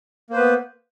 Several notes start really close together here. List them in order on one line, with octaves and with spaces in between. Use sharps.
A#3 C5 B4 B3